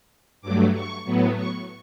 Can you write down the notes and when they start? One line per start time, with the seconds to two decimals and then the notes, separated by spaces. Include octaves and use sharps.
0.41 G2 F#3 A3 D6
0.73 C#6
1.05 A2 F#3 B3
1.37 C#6